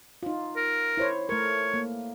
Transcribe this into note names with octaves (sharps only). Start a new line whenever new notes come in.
D#4 F4
A#4
E4 C5 C#5
A3 A#4 C#5
A#3